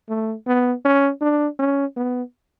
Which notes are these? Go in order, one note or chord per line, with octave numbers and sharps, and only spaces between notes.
A3
B3
C#4
D4
C#4
B3